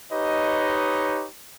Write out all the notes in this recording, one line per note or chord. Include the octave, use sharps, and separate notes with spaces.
D#4 G4 B4 C#5 D#5